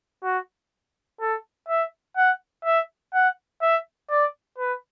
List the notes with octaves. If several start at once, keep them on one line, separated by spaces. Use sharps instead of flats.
F#4
A4
E5
F#5
E5
F#5
E5
D5
B4